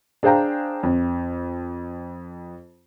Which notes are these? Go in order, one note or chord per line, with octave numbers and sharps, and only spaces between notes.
D4 G#4 C5 F5 G5 A#5
F2